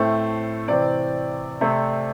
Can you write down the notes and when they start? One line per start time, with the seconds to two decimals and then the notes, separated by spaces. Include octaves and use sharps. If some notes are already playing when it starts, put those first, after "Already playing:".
Already playing: A2 A3 C4 C5
0.68 C3 E3 C4 D5
1.61 C3 A3 C4